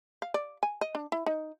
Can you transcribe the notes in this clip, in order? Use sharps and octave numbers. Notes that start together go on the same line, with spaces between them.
F5
D5
G#5
D#5
D4
E4
D#4